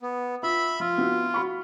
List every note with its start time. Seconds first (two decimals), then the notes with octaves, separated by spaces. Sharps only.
0.01 B3
0.43 F4 E5 B5
0.80 F3 F4
0.98 B3 E4 F#4
1.34 F#4 B5 C#6